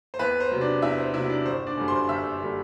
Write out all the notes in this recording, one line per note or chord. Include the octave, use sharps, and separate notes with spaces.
C5
E2 B4
C5
C3 F#3
D4 D5
E2 E4 E5
C5
C3 F#3 E4 E5
D4 D5
G1 C5
D4 D5
F#2 D3 G3
C5 C6
G1 E5 E6
D3 G3